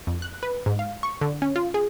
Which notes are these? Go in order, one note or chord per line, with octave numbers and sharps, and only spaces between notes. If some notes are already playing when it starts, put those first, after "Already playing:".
F2
F#6
B4
G#2
F5
C#6
D3
C#4
F4
G#4